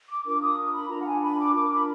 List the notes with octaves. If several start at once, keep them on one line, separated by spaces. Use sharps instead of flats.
D6
D4 F4 A#4 D6
D#6
B5
D4 F4 A#4 A#5
F#5
G#5
B5
D6
D4 F4 A#4 D6
B5